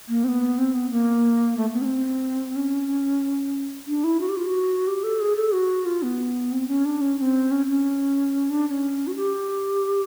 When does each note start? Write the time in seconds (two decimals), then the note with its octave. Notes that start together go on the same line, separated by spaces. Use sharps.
0.09 A#3
0.24 C4
0.28 B3
0.58 C4
0.74 B3
0.91 A#3
1.57 A3
1.73 B3
1.81 C#4
1.85 C4
2.56 C#4
3.87 D4
4.04 E4
4.20 F#4
4.29 G4
4.37 F4
4.45 F#4
4.87 G4
5.03 A4
5.20 G#4
5.36 A4
5.53 F#4
5.86 F4
6.03 B3
6.52 C4
6.68 C#4
6.85 D4
7.01 C#4
7.18 C#4
7.21 C4
7.51 C#4
7.67 C#4
8.50 D4
8.67 D4
8.70 C#4
9.07 F#4
9.16 G4